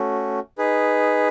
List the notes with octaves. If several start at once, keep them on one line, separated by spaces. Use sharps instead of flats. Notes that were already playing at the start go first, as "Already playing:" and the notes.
Already playing: A3 C#4 F#4
D#4 G#4 B4